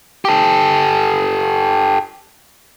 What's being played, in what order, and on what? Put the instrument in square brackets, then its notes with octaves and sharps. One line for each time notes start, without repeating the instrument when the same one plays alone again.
[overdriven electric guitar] G4 A4